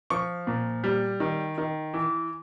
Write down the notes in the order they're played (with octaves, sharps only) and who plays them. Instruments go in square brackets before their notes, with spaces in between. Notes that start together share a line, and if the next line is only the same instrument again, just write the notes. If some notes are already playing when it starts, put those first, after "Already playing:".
[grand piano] F3 C#6
A#2
G3
D#3
D#3
E3